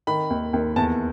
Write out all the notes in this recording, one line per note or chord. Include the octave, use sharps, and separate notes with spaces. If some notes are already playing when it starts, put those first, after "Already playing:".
D#3 B5
D#2
D#2
E2 A5